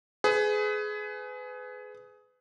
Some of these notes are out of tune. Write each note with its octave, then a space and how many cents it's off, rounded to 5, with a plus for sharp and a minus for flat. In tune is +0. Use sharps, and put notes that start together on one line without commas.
G#4 +20 B4 +30